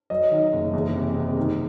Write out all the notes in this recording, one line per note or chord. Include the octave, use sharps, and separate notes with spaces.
F#3 D#5
D#3
F#1
E2
C3
C3
D#3